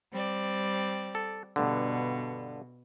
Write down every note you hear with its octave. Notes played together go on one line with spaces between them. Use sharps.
G3 C4 D5
A4
G2 B2 D3